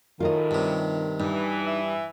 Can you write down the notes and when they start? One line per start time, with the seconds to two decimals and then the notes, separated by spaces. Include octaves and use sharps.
0.20 F#2 A2 D#3 F4 A#4 D#5
0.51 G2 C3
1.20 G2 E3 D#4
1.66 E5